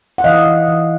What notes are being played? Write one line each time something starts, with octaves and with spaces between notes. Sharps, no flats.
F#5
E3 D#5 F5
E3
E3